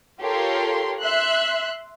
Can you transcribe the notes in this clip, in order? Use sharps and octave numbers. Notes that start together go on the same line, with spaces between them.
F4 G4 A4 A#4 C#5 C6
E5 C6 F#6